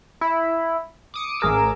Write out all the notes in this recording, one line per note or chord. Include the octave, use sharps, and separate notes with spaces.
E4
D6 D#6 C#7
A1 G#4 A#4 D6 E6